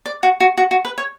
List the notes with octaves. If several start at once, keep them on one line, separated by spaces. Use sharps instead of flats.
D5
F#4
F#4
F#4
F#4
B4
C#5